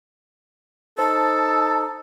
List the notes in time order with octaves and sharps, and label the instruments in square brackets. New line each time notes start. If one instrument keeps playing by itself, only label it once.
[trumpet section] D#4 [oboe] A4 [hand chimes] C5 [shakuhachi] A5